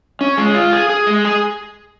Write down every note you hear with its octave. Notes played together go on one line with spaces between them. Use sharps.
C#4
G#3
F4
G#4
G#4
G#3
G#4